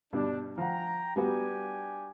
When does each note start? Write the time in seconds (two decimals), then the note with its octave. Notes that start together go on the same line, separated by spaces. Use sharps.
0.13 G2 B2 G3 D4
0.58 F3 F#5 G5 A#5
1.16 G3 B3 D4 F#4 G4 G#5